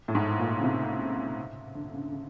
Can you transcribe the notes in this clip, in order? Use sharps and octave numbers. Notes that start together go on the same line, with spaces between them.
A2
G#2
A#2
C#3
C3
D3
C#3
C#3